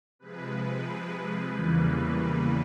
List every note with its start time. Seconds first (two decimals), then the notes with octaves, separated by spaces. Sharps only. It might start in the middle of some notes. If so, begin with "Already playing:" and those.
0.19 C3 F3 G#3 B4
1.52 E2 C#3 E3 G3 A#3